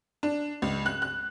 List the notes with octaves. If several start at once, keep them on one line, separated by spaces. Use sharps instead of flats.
D4
C#2
F#6
F#6